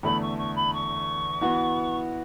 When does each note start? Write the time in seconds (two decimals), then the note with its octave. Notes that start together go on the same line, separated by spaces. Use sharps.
0.03 E2 D3 A3 B5
0.21 C#6
0.38 C#6
0.55 B5
0.73 C#6
1.41 E3 B3 F#4